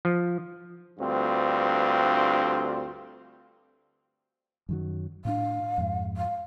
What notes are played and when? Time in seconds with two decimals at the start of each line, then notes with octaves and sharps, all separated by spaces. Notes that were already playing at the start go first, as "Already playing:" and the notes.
0.05 F3
0.99 D2 G2 C4 F4
4.69 F#2 D#3 F#3
5.25 A2 C4 D4 F5
5.78 F2 G#2
6.17 F5